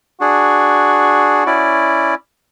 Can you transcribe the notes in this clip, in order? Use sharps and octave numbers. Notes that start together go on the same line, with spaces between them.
D4 F#4 G#4
C#4 E4 D5